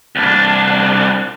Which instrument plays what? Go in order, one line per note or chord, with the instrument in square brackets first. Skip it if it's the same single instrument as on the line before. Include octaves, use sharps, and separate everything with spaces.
[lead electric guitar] C2 D4